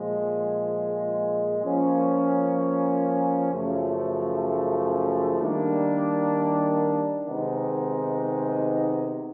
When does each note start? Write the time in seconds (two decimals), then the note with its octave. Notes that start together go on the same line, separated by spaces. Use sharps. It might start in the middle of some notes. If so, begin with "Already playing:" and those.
Already playing: A#2 F3 G#3
1.63 F3 A#3 C#4
3.52 F#2 C#3 F3 A3
5.39 D#3 G3 A#3 D4
7.27 C3 D#3 G#3 B3 D#4